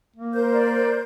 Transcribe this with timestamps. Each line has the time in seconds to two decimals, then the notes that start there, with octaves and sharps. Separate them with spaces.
0.16 A#3
0.33 A#4 C5 G6
0.53 D5